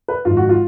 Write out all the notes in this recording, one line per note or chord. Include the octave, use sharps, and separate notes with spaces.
B4
G#1 G#2 F3 F4
F#4
F4